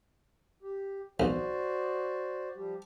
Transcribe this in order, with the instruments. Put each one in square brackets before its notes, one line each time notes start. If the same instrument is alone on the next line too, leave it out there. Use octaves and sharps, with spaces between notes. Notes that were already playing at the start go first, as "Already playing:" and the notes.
[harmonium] G4
[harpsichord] B1 [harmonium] F#4 C5 D5
[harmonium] F3 G3 G4